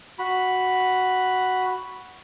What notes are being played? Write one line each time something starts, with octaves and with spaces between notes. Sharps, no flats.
F#4 B5